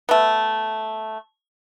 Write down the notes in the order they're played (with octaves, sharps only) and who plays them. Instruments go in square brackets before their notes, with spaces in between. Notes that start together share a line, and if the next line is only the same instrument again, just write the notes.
[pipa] A3 B3